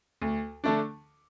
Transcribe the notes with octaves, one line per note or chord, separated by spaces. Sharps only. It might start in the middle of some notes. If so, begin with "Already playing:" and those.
D2
D3 A3 D4